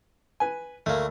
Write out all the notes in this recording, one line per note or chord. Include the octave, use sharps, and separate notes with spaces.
B4 G#5
D2 A3 A#3